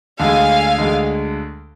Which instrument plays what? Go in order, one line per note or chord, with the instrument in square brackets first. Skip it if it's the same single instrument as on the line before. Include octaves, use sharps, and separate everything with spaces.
[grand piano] D2 D3 G#3 [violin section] F5 G#5
[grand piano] D2 D3 G#3